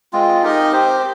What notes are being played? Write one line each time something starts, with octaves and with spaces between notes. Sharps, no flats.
G#3 C4 F4
D#4 G4 A#4 D#5
C4 G4 C5